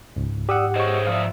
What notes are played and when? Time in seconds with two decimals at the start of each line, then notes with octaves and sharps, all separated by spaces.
0.16 C#2 G#2
0.49 G4 D5 F#5 D#6 E6
0.76 G#4 C5 C#5 D#5 C#6
1.07 F3 D5 E5 F5 D#6